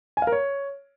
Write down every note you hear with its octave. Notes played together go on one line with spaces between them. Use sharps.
G#5
F5
A#4
C#5